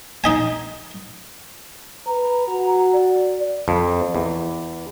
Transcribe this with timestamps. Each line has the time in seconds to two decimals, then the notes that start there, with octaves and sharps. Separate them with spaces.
0.24 D#4 D#5 G#5
2.06 B4 A#5
2.48 F#4
2.93 D5
3.68 F2
4.15 E2